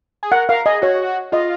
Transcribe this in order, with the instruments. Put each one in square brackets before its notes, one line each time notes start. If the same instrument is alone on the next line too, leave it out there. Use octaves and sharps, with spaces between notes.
[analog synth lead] G#4
[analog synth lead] A#4 [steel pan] F#5
[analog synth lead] A#4 [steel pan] F5
[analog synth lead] G#4 [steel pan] D#5
[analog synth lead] F#4 [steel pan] C#5
[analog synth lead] F4 [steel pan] D#5